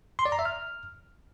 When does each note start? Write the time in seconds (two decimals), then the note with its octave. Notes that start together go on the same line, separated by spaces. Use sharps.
0.19 C6
0.26 D5
0.32 A#5
0.39 E5
0.45 F6